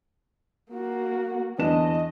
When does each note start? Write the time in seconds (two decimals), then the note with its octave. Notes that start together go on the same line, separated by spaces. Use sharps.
0.72 A#3 F#4
1.59 E2 D4 D#5 E7